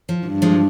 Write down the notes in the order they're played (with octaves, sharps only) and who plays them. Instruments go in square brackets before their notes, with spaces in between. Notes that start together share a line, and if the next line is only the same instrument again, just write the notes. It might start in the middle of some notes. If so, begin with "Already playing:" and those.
[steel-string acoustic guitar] F3
[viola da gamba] G2
[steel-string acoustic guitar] F3 G#3